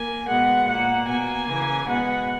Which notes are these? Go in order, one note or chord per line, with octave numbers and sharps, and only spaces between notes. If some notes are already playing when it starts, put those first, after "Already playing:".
Already playing: A#3 G#5
B2 G#3 B3 F#5
A#2 A#3 F#5
B2 A#3 G#5
C#3 E3 A#3
B2 G#3 B3 F#5